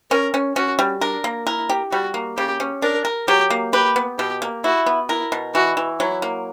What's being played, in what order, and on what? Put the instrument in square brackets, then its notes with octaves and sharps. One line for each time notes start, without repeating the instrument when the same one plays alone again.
[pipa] C#4 [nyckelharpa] A#4
[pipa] C#4
[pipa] C#4 [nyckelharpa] F#4
[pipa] G3
[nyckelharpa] D4 [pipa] A#4
[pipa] A#3
[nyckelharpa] E4 [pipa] A#4
[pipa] G4
[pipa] G3 [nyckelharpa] F#4
[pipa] A#3
[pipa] C#3 [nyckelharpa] G4
[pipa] C#4
[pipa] D4 [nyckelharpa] A#4
[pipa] A#4
[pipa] F#3 [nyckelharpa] G4
[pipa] A#3
[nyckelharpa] G4 [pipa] B4
[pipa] B3
[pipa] B2 [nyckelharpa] G4
[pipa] A#3
[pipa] E4 [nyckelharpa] F#4
[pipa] B3
[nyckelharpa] E4 [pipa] A#4
[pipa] B2
[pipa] E3 [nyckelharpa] F#4
[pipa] E3
[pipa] F#3 [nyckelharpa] E4
[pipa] A#3